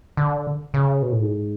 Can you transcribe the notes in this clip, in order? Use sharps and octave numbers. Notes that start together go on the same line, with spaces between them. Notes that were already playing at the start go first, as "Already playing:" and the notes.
D3
C#3
B2
A2
G#2